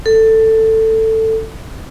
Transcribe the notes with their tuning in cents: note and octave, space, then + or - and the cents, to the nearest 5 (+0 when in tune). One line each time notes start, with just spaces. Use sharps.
A4 +15